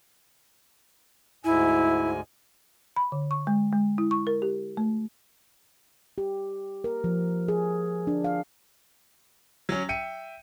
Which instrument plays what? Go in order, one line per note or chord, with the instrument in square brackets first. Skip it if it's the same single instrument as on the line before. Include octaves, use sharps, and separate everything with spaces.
[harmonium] D2 G#2 G#5 [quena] E4
[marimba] B5
D3
C#6
G#3
G#3
E4
C#6
A#4
G4
A3
[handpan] G4
A#4
F3
G#4
D4
F5
[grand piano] F#3 C#4
E5 G5 C#7 D#7